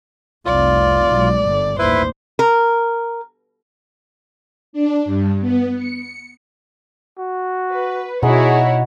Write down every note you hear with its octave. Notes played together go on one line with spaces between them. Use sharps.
F1 C2 F4 D5
B1 G#3
G1 D3
A1 D#2 E4 B4 C5
A#4
D4
G2
B3
C#7
F#4
B4
B2 D#4 E4 F#4 G#4 B4 C#5 F#5